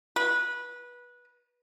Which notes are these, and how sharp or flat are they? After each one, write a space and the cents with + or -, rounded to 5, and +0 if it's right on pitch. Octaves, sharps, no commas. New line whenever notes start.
B4 -20